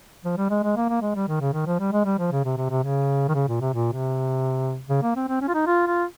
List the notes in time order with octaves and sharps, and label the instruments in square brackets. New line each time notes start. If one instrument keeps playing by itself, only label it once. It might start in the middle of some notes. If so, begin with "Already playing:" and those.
[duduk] F3
G3
G#3
G#3
A#3
A#3
G#3
G3
D#3
C#3
D#3
F3
G3
G#3
G3
F3
C#3
C3
C3
C3
C#3
D#3
C#3
A#2
C3
A#2
C3
C#3
A#3
C4
C4
C#4
F4
D#4
F4
F4